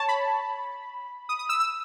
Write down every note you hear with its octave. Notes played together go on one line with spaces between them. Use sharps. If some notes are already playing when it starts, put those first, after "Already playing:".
Already playing: C#5 A5
B5
D#6
D#6
E6
E6